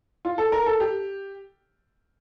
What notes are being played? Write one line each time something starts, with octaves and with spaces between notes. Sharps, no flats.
F4
A4
A#4
A4
G4